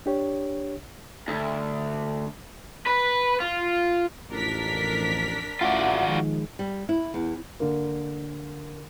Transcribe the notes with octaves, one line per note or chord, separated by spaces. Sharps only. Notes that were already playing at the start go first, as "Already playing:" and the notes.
D4 G4 C#5
D2
B4
F4
A1 F2 D4 A#4 B6
A1 F4 F#4 D5 E5 F#5
D#3 F3 G#3
G3
E4
E2
D3 A#3